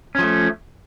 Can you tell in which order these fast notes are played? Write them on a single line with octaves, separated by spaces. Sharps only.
C#4 F3 A3